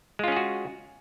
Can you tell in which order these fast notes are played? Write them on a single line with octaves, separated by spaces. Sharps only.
G#3 F4 C#4 G#4 F#4